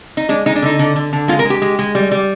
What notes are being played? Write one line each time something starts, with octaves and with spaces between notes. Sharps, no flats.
D#4
G#3 D4
G#3 D#4
D4
D3 D#4
D3
D3
D3
G#3 F4
A#4
G#3
G4
G#3
G#3
G3
G3